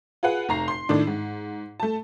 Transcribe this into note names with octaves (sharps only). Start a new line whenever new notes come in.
F4 G#4 B4 F#5
F1 A#5 C7
C6 C7
A2 D#3 D4
G#2
A3 A5